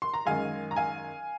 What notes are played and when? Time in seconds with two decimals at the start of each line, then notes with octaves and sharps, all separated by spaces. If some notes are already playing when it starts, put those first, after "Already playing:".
0.02 C6
0.14 A#5
0.25 F#2 D#3 G#3 F5 G#5
0.71 A#5
0.76 F5 G#5